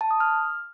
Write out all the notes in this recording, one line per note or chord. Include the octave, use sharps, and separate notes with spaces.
A5
D#6
F6